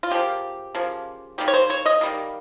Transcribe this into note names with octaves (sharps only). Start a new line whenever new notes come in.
F4
C#3 F3 A#3 G4
C#3 F3 A#3
D#3 G3 A#3 G4
C#5
C5
C#5
D#5
D#3 G3 A#3